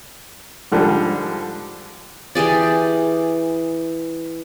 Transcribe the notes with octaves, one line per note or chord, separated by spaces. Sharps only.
G#2 D3 F3 G3
E3 G4 G#4 D5